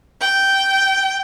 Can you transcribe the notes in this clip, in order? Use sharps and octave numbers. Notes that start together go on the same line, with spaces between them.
G5